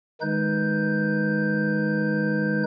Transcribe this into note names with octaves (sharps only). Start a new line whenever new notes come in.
D#3 G#3 D#4 B4 G6